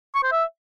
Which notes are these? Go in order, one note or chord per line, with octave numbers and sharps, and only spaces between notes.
C#6
C5
E5